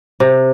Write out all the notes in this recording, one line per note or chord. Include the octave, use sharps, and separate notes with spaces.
C3